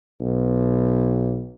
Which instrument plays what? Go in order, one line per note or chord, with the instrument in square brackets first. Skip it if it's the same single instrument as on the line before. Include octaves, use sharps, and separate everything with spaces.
[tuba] B1